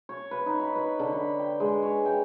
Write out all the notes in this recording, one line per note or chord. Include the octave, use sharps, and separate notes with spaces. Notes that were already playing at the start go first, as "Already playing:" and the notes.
C#5
B4
D#4
B5
B4
D3
B5
G5
G#3
C#5
G5